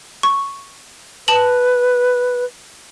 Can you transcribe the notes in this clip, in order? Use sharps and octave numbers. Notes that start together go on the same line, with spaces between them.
C#6
B4 A5 E7 F#7